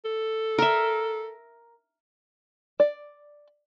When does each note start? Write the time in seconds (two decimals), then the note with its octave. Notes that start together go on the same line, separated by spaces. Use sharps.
0.05 A4
0.58 A#4 E5
2.80 D5